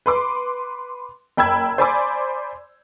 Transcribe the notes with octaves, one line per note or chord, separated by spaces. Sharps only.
B4 C6 D6
F#1 G5 B5 E6 G#6
C5 D5 G#5 B5 C6 D6